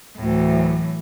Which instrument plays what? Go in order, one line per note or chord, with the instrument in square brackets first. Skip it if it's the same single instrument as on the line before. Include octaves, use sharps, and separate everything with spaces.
[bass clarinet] D2 [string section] A2 E3 F#3